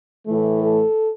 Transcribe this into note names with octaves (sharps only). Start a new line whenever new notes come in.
A2 E3 A3
A4